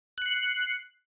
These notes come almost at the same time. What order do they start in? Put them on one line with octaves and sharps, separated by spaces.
F#6 C#7 C7